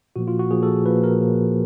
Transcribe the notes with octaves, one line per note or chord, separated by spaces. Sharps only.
A#2 F3 A#3 F#4
F4
F#4
A#2 F3 A#3 G#4
A4
A#2 F3 A#3 B4
A#4
A#2 F3 A#3